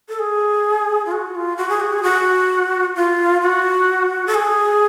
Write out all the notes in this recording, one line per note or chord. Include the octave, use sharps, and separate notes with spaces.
A4
G#4
F4
F#4
F4
F#4
G#4
F#4
G#4
F#4
F4
F#4
A4
G#4